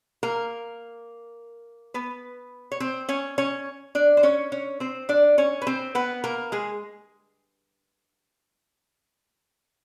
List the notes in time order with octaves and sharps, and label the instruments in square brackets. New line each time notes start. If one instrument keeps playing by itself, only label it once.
[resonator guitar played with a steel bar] A#3 A#4
B3 B4
C#5
C4 C5
C#4 C#5
C#4 C#5
D4 D5
C5
C#4 C#5
C#4 C#5
C4 C5
D4 D5
C#4 C#5
B4
C4 C5
B3 B4
A#3 A#4
G#3 G#4